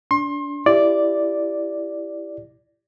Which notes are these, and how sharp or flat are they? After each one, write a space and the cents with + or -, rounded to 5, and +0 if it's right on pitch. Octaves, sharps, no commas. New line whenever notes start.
D4 -25 C6 +30
E4 +10 G4 +0 D5 +0